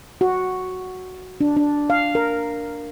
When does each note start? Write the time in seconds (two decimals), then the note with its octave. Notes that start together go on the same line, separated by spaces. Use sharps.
0.21 F#4
1.41 D4
1.57 D4
1.90 F5
2.15 A#4